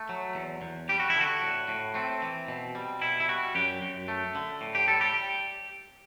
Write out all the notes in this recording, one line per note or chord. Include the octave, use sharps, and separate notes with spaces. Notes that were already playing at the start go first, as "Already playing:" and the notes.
Already playing: A3
F#3
E2
E2
G3 G4
F#4
E4
D3 F#4
A2
A2
A3 C4
E3
B2
G3
B2 E4
E4
G3 F#4
F#2 G4
F#2
A3
D3
A2
G4
G3 A4
G4